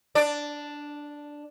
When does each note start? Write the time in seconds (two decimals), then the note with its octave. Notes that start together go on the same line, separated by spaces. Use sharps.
0.15 D4 D5